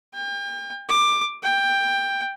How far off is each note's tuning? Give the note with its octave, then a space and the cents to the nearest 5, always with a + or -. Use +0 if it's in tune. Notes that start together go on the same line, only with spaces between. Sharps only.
G5 +35
D6 +15
G5 +10